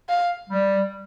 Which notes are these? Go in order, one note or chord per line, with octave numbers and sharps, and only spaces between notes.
F5
G3